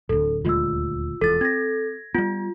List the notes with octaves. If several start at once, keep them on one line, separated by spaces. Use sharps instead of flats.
D1 D2 A4
D#1 D2 G#3 F4 E6
E1 E2 A4 A6
C4 G#6 A#6
G3 B3 F4